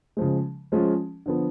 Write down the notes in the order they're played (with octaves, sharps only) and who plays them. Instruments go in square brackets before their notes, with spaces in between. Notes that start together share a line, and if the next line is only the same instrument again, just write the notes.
[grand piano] C#3 F3 G#3
F3 G#3 C#4 F4
D3 F3 B3